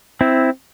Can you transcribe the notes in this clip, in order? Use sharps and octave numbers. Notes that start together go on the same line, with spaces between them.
C4 E4